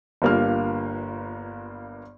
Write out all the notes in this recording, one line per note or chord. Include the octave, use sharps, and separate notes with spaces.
G1 G2 A#3 F4 F6